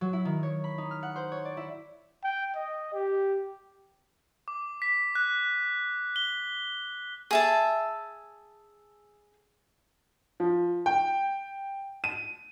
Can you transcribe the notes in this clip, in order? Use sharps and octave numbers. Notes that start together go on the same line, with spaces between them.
F#3
E4
D#3
C#5
B5
D#4
F6
F#5
C5
C#5
D5
E4
G5
D#5
G4
D6
B6
F#6
G7
G#4 E5 A5
F3
G5
D#7